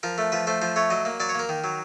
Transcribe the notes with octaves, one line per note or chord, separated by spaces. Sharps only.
F3 A#4
A3
F3 B4
A3 C5
F3 C5
A3 C#5
F#3 D#5
A#3
F#3 D5
C#5
A#3 A#4
D#3
F#3